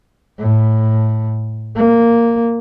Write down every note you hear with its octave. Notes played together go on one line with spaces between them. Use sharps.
A2
A#3